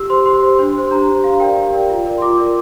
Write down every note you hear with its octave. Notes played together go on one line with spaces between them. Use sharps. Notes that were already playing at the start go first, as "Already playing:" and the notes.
Already playing: G4 E6
C5 C6
G4 C6
C5
D4 C6
G4 C5
D4 A#5
G4 C5
G4 F5
A#4 D5 G5
G4
A#4 D5
F4
A#4 D5
C6
F4 D6
A#4 D5